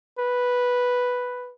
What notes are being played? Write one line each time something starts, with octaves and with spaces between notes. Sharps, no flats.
B4